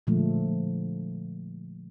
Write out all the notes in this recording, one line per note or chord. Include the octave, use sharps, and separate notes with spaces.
A#2 D3 F3 G#3 A3